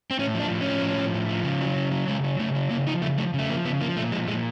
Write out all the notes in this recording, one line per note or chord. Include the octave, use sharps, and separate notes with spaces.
C4
A2 C#4
F3
D4
A2
C#4
F3
A2
F3
A2
F3
C#3
F#3
C#3
F#3
C#3 G#3
F#3
C#3 A3
F#3
C#3 A#3
F3 D#4
C#3 A3
F3 A3
C#3
A3
F3 A#3
C#3 B3
F3 A#3
A#2 A3
F3 G#3
A#2 G#3